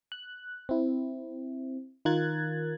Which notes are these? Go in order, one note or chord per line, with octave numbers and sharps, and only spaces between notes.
F#6
C4 E4
D#3 F4 A#4 F#6 G#6 A6